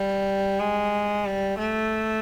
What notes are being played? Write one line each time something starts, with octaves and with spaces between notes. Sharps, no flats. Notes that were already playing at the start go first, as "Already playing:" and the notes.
Already playing: G3
G#3
G3
A3